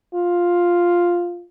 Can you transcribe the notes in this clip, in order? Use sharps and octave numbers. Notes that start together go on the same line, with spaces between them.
F4